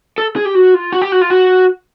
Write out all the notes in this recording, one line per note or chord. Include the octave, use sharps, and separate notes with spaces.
A4
G#4
G4
F#4
F4
F#4
G4
F#4
F4
F#4